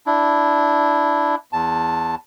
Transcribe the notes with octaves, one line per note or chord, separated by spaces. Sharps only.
D4 E4
E2 A5